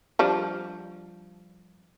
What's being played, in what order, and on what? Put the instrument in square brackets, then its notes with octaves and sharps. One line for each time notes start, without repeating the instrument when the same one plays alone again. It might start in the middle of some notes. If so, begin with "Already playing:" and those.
[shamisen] F3 G3 D4